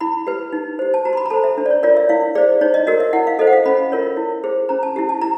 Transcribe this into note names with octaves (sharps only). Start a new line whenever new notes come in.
E4 B5
G4 B4
D#4
G4 C5
A5
F#4 A#5
C6
B5
A#5
A4 C5 A5
E5
D4
D5
C#5
F4 A#4 C#5 D5
E5
E4 F5
G#4 C5 D5
D#4 C#5
D#5
F#4 A#4 D#5
E5
E4 F#5
F5
A4 C5 D#5
F#5
F5
C#4 B5
F4 A#4 C#5
E4
G#4 C5
C#4 A#5
A5
E4 G4
A5
E4 A#5